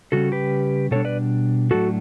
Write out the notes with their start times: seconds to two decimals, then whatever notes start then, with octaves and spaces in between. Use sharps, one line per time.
0.12 C#3 G3 C#4 F#4 A4
0.32 G4 B4
0.91 B2 G3 D4 A4 C#5
1.05 B4 D5
1.71 A2 F#3 A3 D4 F#4 A4